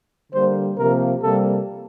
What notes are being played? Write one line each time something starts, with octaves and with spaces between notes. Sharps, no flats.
D3 G3 A#3 C5
C3 F3 A#3 A#4
C3 G3 A#3 A4